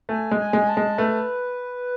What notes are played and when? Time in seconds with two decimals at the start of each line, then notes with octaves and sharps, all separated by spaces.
0.09 A3 G#5
0.31 G#3
0.39 G#5
0.53 G#3
0.69 A5
0.77 G#3
0.98 A3 B4